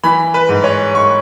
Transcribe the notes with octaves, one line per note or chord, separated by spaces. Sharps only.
E3 B5
B4
G#2
C#5
G#2 C#6